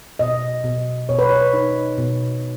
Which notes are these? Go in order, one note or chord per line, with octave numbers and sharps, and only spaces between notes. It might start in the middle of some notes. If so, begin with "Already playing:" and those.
B2 D#5
B2
B2 C#5
B4
C#5
D#4
B2